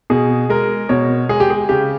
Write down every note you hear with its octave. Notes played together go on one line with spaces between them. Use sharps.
B2 G#4
G#3 A#4
B2 C#5
G#3 G#4
G4
G#4
C#3 G4